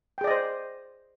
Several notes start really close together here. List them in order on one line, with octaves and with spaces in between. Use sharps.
G5 G#4 D5 D#5 C5